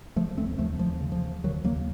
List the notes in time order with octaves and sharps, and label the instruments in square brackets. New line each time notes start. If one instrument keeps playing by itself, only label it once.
[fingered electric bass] C#3 F3 A3
D#2 A3 C4
D#2 F3 A3
D#2 F3
C#3
F3
C#3
D#2 D#3 F#3
D#2 F#3 A#3